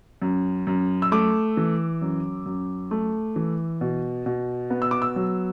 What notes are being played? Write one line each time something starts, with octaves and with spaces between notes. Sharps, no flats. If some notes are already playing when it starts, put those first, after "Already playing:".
F#2
F#2
E6
A3 D6
E3
F#2
F#2
A3
E3
B2
B2
B3
E6
D6
E6
F#3